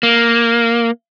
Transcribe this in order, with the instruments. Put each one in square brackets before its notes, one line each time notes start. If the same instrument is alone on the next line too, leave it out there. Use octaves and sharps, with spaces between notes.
[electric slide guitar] A#3